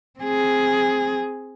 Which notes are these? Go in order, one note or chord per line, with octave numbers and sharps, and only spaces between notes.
C4 G#4